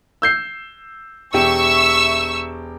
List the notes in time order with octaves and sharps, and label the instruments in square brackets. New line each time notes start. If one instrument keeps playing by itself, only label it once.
[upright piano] E6 G6 C7
[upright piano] E1 G4 [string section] E5 C#6 E6